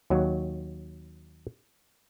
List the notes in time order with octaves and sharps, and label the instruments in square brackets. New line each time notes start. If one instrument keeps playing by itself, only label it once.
[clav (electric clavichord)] D#2 F#3